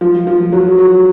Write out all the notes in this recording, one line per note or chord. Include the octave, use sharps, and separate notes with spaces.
F3
F3
F#3
F#3